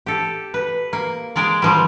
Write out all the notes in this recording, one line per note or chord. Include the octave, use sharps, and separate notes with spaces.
G4 A4
B4
A#3
G#3 A#4 D5
D#3 F3 G3